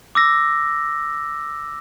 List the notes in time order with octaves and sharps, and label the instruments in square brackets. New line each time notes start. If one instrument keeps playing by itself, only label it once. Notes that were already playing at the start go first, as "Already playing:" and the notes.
[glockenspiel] D6 E6 A#6